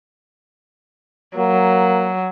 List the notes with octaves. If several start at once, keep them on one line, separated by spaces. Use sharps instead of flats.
F#3 A#3